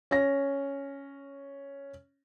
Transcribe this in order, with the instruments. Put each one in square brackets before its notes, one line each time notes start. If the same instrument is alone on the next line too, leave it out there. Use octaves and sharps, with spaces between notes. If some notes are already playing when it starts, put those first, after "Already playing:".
[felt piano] C#4 A#6